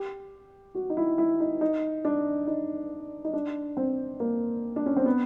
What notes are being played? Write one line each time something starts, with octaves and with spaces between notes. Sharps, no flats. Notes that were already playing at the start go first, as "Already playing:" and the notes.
Already playing: G4
F#4
D#4
E4
E4
D#4
D#4
D4
D#4
D#4
D4
C4
A#3
D4
C#4
C4
B3